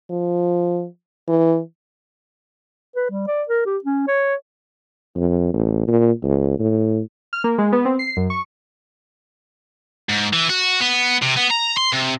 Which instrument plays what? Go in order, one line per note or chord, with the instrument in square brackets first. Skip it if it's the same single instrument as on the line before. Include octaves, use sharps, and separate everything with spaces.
[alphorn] F3
E3
[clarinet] B4
G3
D5
A#4
G4
C#4
C#5
[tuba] F2
A1
A#2
C#2
A2
[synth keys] F6
A#3
G#3
B3
C4
C7
F#2
C#6
[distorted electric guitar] G#2
E3
F#4
B3
C3
B3
A#5
C6
C3